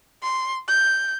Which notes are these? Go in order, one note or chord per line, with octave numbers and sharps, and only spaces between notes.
C6
G6